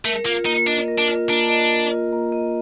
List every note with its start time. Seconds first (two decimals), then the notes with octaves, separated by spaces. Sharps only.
0.05 A3 A#4
0.25 A#3 F4
0.46 A#3 D#4
0.66 D4 D#5
0.88 A#4
0.98 D4
1.08 F4
1.29 A#3 D4
1.49 D#5
1.70 A#4
1.91 F4
2.12 A#3
2.32 D#5